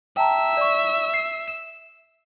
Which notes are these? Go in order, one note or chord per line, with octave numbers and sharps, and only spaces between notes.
E5 G5 A5 A#5
D5 C#6
C7
E7